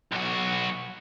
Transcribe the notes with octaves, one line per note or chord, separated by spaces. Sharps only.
B1 F#4